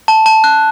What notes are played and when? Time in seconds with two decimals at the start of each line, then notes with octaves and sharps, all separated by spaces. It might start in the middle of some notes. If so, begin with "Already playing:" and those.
0.08 A5
0.26 A5
0.44 F#6